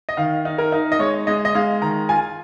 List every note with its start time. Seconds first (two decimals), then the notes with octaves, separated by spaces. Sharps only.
0.09 D#5
0.17 D#3 F5
0.45 D#4
0.58 A#4
0.72 D#4
0.92 D#5
0.99 G#3 C#5
1.27 G#3 D#5
1.45 D#5
1.55 G#3 F5
1.82 D#3 A#5
2.09 F4 G#5